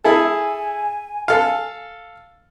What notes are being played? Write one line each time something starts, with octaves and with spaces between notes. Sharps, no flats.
E4 G#4 A4 G#5
A4 F5